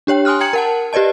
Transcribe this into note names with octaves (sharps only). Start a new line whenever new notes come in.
D4 G4 C#5 G5
G#5 C6 D#6 F6 F#6
G5 A#5 G#6 C#7 F#7
A#4 F#5 A5
G4 B4 D5 D#5 A5